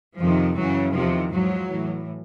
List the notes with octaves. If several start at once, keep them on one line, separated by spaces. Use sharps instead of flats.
F2 C3 D#3 F3
F#2 C#3 E3 F#3
E2 C3 D#3 F3
G#2 F3 F#3
A2 E3